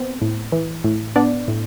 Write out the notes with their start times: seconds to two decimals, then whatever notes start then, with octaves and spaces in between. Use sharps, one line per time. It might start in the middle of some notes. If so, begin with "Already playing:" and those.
Already playing: B3 C4 C5
0.22 A2
0.52 E3
0.84 A2
1.16 B3 D4 D5
1.48 A2